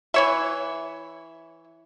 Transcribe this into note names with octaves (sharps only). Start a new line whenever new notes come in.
E3 C#5 E5